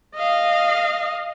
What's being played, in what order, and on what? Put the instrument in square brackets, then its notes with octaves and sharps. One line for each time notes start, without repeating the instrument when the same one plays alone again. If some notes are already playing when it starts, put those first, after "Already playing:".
[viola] D#5 F5